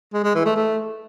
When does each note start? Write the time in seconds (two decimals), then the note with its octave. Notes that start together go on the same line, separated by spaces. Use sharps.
0.14 G#3
0.24 G#3
0.35 E3
0.45 A3
0.56 A3